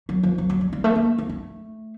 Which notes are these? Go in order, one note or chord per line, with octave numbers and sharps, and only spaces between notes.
F#3
F3
F#3
F#3
G3
G3
A3
A#3
A3
A3